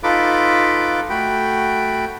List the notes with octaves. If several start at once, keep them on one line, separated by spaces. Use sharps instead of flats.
D#4 F4 A4 B4 B5 D6
A3 F#4 G5 B5